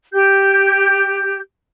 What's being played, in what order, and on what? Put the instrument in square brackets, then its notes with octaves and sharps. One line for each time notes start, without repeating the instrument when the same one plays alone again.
[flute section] G4 G6